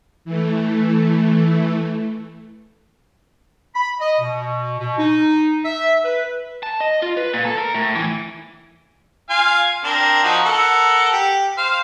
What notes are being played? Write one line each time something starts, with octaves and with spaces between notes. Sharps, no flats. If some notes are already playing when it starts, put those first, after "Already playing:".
E3 A3
B5
D#5
B2
B2
D#4
E5
B4
A5
D#5
F4
B4
A#2
A4
A#4
A2
E3
F4 F5 G#5
C4 D4 A#4
F3 D#4 F#4
A4 A#4 F#5
G4
C5 F5